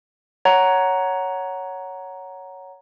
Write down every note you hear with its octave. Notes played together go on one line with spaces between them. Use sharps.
C#5 F#5 A#5